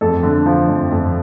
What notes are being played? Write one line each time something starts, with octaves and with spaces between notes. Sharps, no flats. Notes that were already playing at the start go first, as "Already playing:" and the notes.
F2 A4
D3
F3
F2
F2